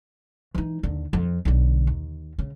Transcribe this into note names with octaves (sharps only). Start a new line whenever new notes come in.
E3 D#4
D#2 D3
F2
B1 D3
D#2
C#3